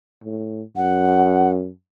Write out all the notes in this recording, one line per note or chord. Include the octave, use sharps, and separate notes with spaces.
A2
F#2 F#5